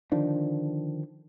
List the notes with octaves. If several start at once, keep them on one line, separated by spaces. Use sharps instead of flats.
D3 D#3 F3 D4